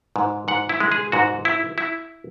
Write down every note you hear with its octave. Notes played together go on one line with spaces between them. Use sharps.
G#2
G#2 F#5
E4
G#3
G#4
G#2 F#4
E4
E4